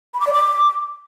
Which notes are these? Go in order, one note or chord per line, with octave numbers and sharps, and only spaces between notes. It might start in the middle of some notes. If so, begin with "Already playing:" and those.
B5
D6
D5
D6